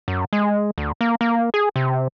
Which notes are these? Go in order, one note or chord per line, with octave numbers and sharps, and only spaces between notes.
F#2
G#3
D2
A#3
A#3
G#4
C3